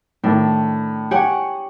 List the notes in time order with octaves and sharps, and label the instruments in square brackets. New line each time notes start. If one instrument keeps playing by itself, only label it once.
[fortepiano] A2 D#3 [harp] D4
[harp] G4 C#5 [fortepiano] F#5 G#5